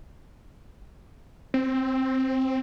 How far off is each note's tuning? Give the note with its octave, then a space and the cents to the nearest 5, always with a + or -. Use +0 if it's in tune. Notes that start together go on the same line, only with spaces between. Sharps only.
C4 +5